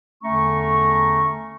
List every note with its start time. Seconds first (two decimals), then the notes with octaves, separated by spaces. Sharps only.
0.23 E2 D3 A3 C#4 A#5 C#6